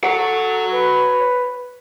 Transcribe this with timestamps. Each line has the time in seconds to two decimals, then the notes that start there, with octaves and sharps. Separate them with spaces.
0.04 A4 C#5 F#5
0.71 B4